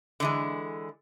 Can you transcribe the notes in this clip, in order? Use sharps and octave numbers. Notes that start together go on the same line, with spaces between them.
D3 E3 G#3